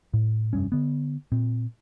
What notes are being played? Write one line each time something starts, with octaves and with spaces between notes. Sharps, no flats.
A2
F1 G2 C#4
D3 B3
A#2 C4